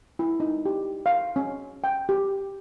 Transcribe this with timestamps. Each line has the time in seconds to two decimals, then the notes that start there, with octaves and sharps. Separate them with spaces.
0.19 E4
0.40 D#4
0.66 G4
1.06 F5
1.36 C#4
1.84 G5
2.09 G4